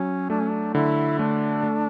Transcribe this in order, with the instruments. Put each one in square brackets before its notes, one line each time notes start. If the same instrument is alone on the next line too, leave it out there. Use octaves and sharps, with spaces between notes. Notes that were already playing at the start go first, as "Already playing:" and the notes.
Already playing: [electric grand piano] F#3 [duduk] C#4
[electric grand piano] A3 [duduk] D4
[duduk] C#4
D4
[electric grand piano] D3 [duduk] E4
[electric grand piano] A3 [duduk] D4
[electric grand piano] A3